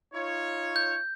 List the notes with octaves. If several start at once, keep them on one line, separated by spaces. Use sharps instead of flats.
D#4 F4 C#5
G6